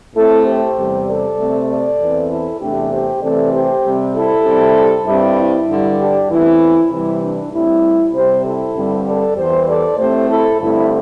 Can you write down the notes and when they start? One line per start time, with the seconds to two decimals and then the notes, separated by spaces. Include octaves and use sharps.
0.15 A2 A3 C4 E4 A4
0.46 G4 C5
0.76 E2 C3 G3
1.07 A4 D5
1.38 C3 A3 C4
1.69 A4 D5
2.00 E2 E3 C4
2.30 E4 A4
2.61 E2 C3 A3 D4 G4
2.92 G4 C5
3.22 C3 E3 A3 C4 A4 D5
3.53 G4 C5
3.84 C3 G3 C4
4.15 E4 A4
4.46 C3 G3 C4
5.06 G2 G3 C4 E4
5.38 E4
5.69 G2 D3 G3
5.99 D4 G4
6.30 E2 E3 A3 C4 E4
6.91 C3 E3 G3 E4
7.22 D4
7.52 A2 G3 C4 E4
8.14 C3 G3 C4 G4 C5
8.45 E4 A4
8.75 G2 D3 G3 C4
9.07 A4 D5
9.37 E2 E3 G3 G4 C5
9.68 A4 D5
9.98 A2 A3 C4 G4 C5
10.29 E4 A4
10.60 G2 D3 A3 C4 E4